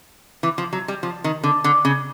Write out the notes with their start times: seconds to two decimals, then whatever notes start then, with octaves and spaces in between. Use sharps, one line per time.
0.43 E3
0.58 F3
0.73 F#3
0.88 G3
1.03 F3
1.24 D#3
1.44 D3
1.64 D3
1.85 C#3